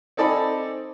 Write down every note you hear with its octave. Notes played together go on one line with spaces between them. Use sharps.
C4 D#4 A4 D5 G#5 B5